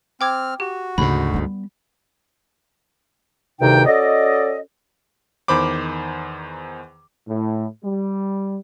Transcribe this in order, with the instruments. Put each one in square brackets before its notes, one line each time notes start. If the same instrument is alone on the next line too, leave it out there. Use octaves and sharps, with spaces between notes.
[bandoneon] C4 F6 [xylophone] G5 D6 G#6
[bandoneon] F#4 [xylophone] G4
[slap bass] D2 G#2 [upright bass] C#3 [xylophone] B5
[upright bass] G3 B3
[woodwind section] D2 G2 C3 D#3 D#4 G5
C#4 F#4 A4 D5 D#5
[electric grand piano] E2 D#3 C5 B5 D6
[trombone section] A2
G3